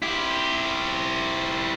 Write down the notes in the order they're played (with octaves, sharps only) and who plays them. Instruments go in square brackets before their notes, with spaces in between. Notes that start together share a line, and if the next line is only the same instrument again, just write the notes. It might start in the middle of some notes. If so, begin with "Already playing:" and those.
[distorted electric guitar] E4 G4